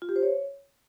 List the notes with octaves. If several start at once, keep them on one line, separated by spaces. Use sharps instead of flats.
F4
G4
C5
C#5